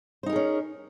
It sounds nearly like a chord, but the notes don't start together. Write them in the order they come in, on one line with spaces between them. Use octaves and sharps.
C5 D#4 A#4 G#4 C#4